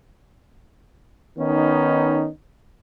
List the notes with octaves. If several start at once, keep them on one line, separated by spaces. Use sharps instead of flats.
D#3 B3 C#4 D#4